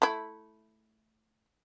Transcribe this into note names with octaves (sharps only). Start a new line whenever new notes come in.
A3 E4